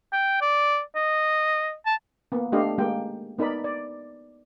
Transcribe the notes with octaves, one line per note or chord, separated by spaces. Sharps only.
G5
D5
D#5
A5
A#3 B3
A3 D4 G4 D#5 F5
G#3 A#3 G4 G5
B3 D#4 A#4 D5 B5
D5